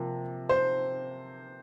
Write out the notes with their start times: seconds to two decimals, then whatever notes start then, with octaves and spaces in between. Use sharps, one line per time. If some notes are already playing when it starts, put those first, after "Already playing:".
Already playing: C3 F3 A#3
0.49 C5